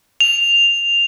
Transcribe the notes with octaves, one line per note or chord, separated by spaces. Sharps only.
F7